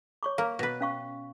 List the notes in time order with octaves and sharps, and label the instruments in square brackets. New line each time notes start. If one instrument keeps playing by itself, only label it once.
[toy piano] C#5 C#6 D6
[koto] A#3 [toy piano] F5
[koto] B2 B4
[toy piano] C#4 F5 C#6